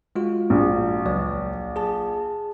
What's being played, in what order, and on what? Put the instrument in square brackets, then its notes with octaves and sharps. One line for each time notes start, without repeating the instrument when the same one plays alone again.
[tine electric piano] G#3 F4 F#4
[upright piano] A#1
[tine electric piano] C#2 F#3 D5
G#4 A5